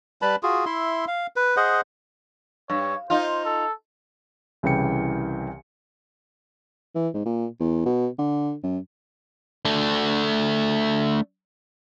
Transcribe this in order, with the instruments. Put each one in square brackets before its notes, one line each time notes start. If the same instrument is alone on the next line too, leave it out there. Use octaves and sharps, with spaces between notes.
[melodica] G3 B4 A5 B5
F4 F#4 G#4
E4 E5 C6
F5
B4
G#4 C5 D#5 F#5
[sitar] G2 [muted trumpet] C#5
[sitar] D#4 F4 [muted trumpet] C5
[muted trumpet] A4
[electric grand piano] C2 C#3 E3 G5 C#7
[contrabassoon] E3
G#2
A#2
E2
B2
D3
F#2
[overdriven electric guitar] A3 D4